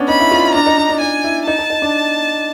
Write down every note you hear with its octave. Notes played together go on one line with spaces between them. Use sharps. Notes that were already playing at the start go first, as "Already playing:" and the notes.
Already playing: B3 C#4 D4
D#4 B5
E4
F4
E4
D4 A#5
D#4
D4
D4
D#4 G#5
E4
D#4 A5
D#4
D#4
D4